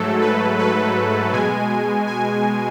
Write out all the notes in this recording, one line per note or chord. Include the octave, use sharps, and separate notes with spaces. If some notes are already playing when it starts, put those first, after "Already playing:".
Already playing: G#2 F#3 A3 A4
B4
B4
B2 G#3 G#5
G#5